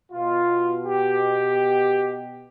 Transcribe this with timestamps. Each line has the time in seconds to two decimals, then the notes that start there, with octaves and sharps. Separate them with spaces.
0.12 B2 F4
0.86 G4